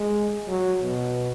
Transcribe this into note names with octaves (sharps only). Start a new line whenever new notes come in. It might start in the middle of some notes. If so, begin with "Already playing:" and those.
Already playing: G#3
F#3
B2